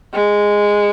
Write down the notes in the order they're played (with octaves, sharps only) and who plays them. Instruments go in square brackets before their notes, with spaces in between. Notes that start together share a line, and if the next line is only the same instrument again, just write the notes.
[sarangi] G#3